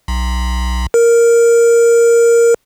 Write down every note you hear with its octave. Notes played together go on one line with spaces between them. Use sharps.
B1
A#4